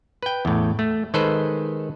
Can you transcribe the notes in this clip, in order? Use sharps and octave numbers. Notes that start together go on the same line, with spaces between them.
B4 G5
E2 A2
A3
D#3 G#3 A4 B4 C5